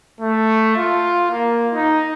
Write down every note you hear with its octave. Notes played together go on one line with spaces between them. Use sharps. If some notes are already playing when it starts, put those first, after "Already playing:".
A3
F4
A#3
D#4